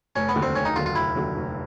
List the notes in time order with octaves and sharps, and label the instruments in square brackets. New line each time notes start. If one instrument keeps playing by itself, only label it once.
[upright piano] F1 [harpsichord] C#4
[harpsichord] B3
[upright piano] D#2 D3 F#3
[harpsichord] C4
[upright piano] F1 [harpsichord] C#4
[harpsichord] D#4
[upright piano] D#2 D3 F#3 [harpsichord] F4
[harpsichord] F4
[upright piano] F1 [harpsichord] E4
[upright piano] D#2 D3 F#3
F1